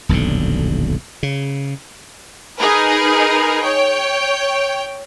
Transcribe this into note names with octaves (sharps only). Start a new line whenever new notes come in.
D#1 B1 F2 D3
C#3
D#4 G#4 A#4 B4
C#5 G5